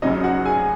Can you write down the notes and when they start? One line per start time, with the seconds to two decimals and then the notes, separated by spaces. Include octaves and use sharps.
0.02 F#2 C#3 F#3 C#4 D#4 D#5
0.24 F#4 F#5
0.45 G#4 G#5